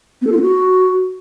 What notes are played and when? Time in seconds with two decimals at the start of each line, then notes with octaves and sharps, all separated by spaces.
0.22 B3
0.27 A4
0.32 F4
0.37 B3
0.42 F#4